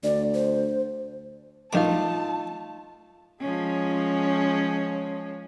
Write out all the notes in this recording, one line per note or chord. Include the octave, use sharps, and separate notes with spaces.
D2 D5
C5
A#1 F#2 A3 D#4 F4 A5 D6
F3 G#3 C#4